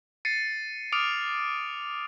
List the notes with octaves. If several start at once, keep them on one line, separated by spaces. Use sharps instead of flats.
A6 C7 C#7 D#7
D6 D#6 F6 C#7 D7 F7